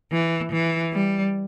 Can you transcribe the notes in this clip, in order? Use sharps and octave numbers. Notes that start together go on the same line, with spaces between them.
E3
E3
G3